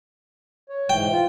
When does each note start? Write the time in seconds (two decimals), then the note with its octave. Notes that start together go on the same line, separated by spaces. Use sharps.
0.69 C#5
0.89 G#2 E3 G5
1.11 F4